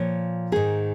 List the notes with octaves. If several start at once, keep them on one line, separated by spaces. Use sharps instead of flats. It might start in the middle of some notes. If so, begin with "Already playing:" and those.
Already playing: A#2 F3 C#5
G#2 D#3 G#4